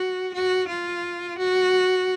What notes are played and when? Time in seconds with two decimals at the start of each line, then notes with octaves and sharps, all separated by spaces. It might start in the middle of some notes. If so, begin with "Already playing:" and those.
Already playing: F#4
0.34 F#4
0.68 F4
1.38 F#4